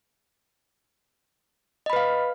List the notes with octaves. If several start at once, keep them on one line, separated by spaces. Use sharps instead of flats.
B4 D#5 F5 B5